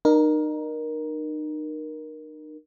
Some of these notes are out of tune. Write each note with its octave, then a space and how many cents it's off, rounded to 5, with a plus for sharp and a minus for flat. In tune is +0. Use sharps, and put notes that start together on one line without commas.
D#4 -35 A#4 +15